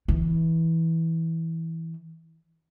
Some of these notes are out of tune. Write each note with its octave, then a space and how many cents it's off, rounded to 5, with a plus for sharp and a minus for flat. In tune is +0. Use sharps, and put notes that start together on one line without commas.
E3 -15